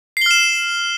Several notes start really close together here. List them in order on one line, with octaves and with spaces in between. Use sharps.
C7 G7 F6 E7